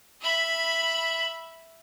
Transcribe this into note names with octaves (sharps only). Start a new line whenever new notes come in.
E5 B5